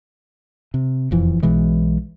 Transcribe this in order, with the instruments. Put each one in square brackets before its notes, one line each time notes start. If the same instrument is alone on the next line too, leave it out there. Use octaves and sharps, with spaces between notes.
[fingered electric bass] C3
E1 F2 E3
B1 B2 E3 G#3